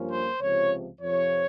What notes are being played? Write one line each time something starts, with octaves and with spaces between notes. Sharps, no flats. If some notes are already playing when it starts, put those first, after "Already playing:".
Already playing: G2 F3 A#3 C#4
C5
C#2 C3 F3 C#5
F2 C3 F3 C#5